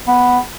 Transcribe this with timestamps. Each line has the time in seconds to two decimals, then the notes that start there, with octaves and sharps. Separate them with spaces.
0.07 B3